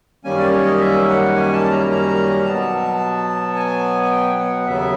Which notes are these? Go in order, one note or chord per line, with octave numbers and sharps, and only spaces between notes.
F#2 D#3 G3 A#3 C#4 G#5
D5
C#5
D#5
E5
F#5
G#5
A5
A#5
A#5
B2 F#3 B3 A5
G#5
G#5
G5
F#5
D#2 C#3 F#3 B3 E5